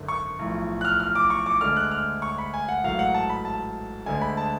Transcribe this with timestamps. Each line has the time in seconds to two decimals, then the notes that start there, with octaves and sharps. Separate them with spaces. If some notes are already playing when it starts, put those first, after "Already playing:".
Already playing: G#1 F#2 D3
0.08 C#6
0.39 B1 A2 F3
0.81 F#6
0.85 F6
1.00 F6
1.15 D6
1.30 C#6
1.46 D6
1.61 D2 D3 G#3 F6
1.76 F#6
1.91 F6
2.22 C#6
2.38 B5
2.54 G#5
2.69 F#5
2.84 A1 G#2 F#3 A3 F5
2.99 F#5
3.14 A5
3.30 B5
3.45 A5
4.06 D2 D3 G#3 G#5
4.21 B5
4.37 A5